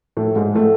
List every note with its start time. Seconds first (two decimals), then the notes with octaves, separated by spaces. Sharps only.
0.17 A2 A3
0.36 G#2 G#3
0.55 A2 A3